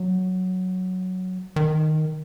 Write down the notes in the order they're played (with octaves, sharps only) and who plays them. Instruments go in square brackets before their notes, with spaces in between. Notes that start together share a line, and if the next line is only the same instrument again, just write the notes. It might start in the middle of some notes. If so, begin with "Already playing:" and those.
Already playing: [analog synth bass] F#3
D#3